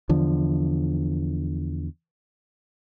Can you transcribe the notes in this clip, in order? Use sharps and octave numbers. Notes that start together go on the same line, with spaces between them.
E2 D3 F3